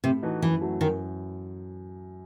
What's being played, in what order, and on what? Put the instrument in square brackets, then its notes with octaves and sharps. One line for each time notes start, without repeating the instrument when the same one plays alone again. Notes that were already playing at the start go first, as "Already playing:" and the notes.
[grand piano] A2 [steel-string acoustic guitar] C3
[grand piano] E3 A3 D#4 F#4
[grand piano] F#2 [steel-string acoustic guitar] E3
[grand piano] F#3 A3
[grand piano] F#2 [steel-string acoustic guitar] D#3